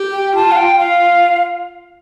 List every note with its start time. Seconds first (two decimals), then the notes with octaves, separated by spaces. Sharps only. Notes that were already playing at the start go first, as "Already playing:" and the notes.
Already playing: G4
0.12 G5
0.35 F4 A5
0.51 F5
0.57 G5
0.78 F4 F5